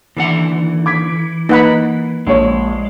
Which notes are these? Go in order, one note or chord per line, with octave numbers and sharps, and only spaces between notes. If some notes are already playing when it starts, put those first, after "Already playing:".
D#2 D3 E3 F#5
D6 G#6 B6
A#3 D#4 B4 F#5 B5
A#1 G#3 C#5